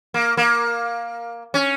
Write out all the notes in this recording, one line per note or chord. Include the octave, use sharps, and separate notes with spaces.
A#3
A#3
C#4